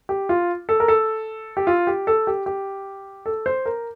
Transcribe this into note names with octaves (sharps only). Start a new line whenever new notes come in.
G4
F4
A4
A#4
A4
G4
F4
G4
A4
G4
G4
A4
C5
A#4